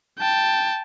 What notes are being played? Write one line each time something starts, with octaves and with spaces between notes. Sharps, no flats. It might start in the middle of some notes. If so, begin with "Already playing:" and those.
G5 A5